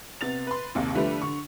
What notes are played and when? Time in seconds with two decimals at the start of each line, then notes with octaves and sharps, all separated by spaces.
0.21 C3 B3 A6 F7
0.47 B4 C6
0.75 A#1 D#2 C3
0.95 D3 F3 G3 A3 B4
1.22 D3 C#6